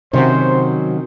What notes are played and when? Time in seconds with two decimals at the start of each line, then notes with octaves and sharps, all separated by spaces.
0.13 C3 D#3 F#3 C#4 F#4 C5